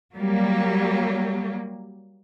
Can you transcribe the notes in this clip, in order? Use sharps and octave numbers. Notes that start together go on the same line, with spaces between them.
F#3 G3 A#3